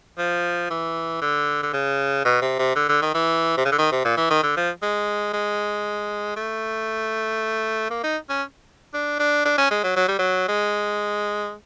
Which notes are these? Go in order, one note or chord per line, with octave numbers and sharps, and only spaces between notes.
F3
E3
D3
D3
C#3
B2
C3
C3
D3
D3
D#3
E3
C3
C#3
D3
D#3
C3
A#2
E3
D#3
D3
F3
G#3
G#3
A3
A#3
D#4
C#4
D4
D4
D4
C#4
G#3
F#3
F#3
G3
F#3
G#3